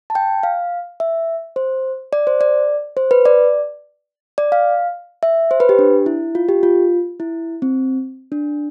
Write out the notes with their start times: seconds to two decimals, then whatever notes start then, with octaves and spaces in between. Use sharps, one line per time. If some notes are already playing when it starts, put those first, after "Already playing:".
0.10 A5
0.15 G5
0.43 F5
1.00 E5
1.56 C5
2.13 D5
2.27 C5
2.41 D5
2.97 C5
3.11 B4
3.25 D5
4.38 D5
4.52 F5
5.23 E5
5.51 C5
5.60 B4
5.69 G4
5.79 D4
6.06 E4
6.35 F4
6.48 G4
6.63 F4
7.20 E4
7.62 C4
8.32 D4